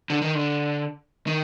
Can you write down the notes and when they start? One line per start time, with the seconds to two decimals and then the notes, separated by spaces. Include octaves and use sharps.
0.10 D3
0.22 D#3
0.35 D3
1.27 D#3